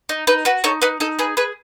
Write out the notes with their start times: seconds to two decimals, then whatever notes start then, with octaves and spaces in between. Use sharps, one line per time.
0.09 D#4
0.27 D#4 B4
0.45 F#4 B4
0.64 D#4 A4 C#5
0.82 D#4 B4
1.00 D#4 A4
1.19 G#4 B4
1.37 G#4 B4